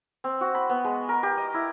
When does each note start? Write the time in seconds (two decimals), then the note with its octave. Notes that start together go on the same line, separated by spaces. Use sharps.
0.24 C4
0.41 F#4
0.55 B5
0.69 B3
0.84 G#3
1.09 A#4
1.23 G4
1.37 D#5
1.54 E4